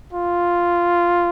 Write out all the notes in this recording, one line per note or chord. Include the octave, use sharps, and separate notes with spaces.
F4